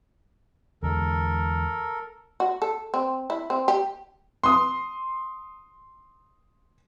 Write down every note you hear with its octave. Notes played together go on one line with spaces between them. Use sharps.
E2 D3 G#3 A4 A#4
F#4
A4
C4
E4
C4
G4
C6 D#6